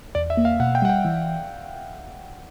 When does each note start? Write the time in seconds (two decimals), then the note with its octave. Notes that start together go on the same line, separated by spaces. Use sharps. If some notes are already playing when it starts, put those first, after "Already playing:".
0.15 E2 D5
0.30 E5
0.37 A#3
0.45 F5
0.60 B2 F#5
0.75 G5
0.82 G3 F#5
0.90 G5
1.05 E3